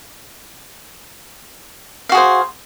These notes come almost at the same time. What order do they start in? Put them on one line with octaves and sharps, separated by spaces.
F5 F#4 G#4 C5